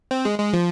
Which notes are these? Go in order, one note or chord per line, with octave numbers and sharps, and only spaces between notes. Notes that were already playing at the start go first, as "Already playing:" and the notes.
C4
G#3
G#3
F3